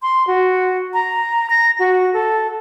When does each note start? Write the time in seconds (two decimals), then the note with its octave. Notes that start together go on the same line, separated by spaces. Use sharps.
0.02 C6
0.27 F#4
0.94 A#5
1.50 A#6
1.79 F#4
2.13 A4